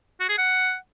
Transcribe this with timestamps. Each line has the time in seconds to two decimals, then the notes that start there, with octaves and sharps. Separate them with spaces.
0.20 F#4
0.29 G#4
0.38 F#5